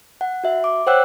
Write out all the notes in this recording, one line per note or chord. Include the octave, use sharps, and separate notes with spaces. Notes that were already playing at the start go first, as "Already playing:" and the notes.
F#5
F#4 E5
D6
C5 C#5 F#5 G5 E6 F#6